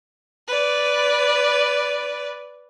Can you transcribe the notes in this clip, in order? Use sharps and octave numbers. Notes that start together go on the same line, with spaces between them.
B4 D5